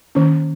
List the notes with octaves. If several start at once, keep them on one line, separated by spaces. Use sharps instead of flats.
D#3 A#3 C#4